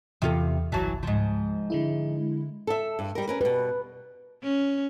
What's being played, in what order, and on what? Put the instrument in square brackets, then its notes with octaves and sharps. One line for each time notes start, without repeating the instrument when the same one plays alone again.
[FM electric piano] E2 [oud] C3 F4 A4
[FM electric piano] G1 C2 A5 [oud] E3 F#3
[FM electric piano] C#2 [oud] G#2 F3
[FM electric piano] D3 G#3 E4
[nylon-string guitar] A4 E5
G2
G3 A#4
C#4 A#4 B4
[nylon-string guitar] B2 G3 [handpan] B4
[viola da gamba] C#4